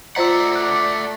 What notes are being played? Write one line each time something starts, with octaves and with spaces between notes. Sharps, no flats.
A3 F4 C5 D5 D#5 F#5 A#5 E6
D6 F#6